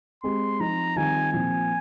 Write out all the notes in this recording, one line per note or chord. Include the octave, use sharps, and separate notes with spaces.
G#3 C4 G4 C6
F3 C4 D#4 A#5
D#3 G3 C4 F4 G#5
A#2 F3 C4 G#5